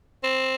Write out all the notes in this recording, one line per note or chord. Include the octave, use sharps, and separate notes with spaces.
C4